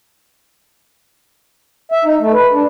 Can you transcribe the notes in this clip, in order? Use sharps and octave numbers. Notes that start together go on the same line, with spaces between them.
E5
D#4
A3
B4
D4